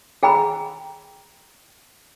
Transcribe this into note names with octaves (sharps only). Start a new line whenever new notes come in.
G#4 G5 A#5 B5